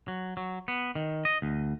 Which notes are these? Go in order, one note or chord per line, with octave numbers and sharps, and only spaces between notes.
F#3
F#3
B3
D#3
D#5
D2